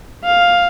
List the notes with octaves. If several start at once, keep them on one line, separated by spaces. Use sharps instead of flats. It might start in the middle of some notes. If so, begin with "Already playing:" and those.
F5